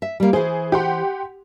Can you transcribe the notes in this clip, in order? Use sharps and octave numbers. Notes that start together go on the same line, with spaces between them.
E5
G3 A#3
E3 G#4 C5
G4 F#5 C6